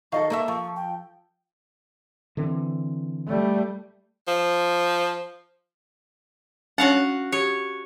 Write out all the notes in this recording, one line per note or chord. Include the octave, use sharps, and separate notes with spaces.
D#3 A4 D#5 F5 C#6
A#3 A4 D5 E5
F3 C#6
G5
D3 E3 C4
G3 A3
F3
C#4 D4 F#4 C#5 F5 F#5
G4 C#5